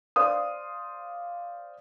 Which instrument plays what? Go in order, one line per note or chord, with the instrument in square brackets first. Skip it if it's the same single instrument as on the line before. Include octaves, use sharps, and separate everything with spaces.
[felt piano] C5 D5 F5 C6 D#6